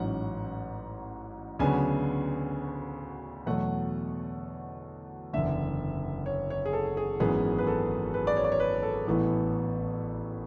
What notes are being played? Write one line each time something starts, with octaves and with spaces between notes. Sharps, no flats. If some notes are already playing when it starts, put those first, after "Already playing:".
Already playing: A1 G#2 F#3 C#4 F#5
D2 C#3 F#3 B3 D4 G#5
E2 B2 F#3 A3 F#5
F#1 E2 D3 E5
C#5
C#5
G#4
A4
G#4
G#1 F#2 E3 G#3 B3 G#4
B4
A4
B4
D5
C#5
D5
C#5
B4
A4
A1 A2 E3 B3